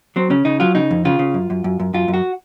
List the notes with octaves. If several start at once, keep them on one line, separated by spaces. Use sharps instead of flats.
F#3 C4
C#3 C#4
C#3 D#4
F#3 F4
C#3 D#4
F2
C#3 F4
C#3
F#2
F#2
F#2
F#2
F#2 F4
F#2
F#4